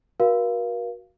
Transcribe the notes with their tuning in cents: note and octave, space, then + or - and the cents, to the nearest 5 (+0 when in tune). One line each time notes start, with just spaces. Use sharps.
F#4 +0 A#4 +40 F5 -15